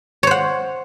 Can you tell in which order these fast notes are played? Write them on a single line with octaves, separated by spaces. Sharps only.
C#5 C5 F#5